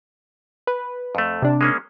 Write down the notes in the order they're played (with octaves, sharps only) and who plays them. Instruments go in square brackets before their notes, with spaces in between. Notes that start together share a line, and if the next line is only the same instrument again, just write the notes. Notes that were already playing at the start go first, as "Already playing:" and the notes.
[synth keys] B4
[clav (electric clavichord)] F2 A3
[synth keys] C3 D4
[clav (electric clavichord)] G#3 A#3 C#4